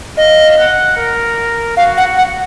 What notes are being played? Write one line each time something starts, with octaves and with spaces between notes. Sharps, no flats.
D#5 F5
F#5
A#4
F#4 F5
F#5
F#5